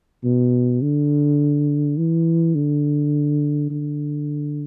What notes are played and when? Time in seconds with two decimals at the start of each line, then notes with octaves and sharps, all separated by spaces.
0.24 B2
0.82 D3
1.98 E3
2.55 D3
3.70 D3